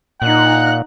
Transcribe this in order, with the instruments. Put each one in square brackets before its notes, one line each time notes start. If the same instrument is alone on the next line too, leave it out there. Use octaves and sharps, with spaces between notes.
[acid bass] A#2 [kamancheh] D#4 F#6 [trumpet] F#5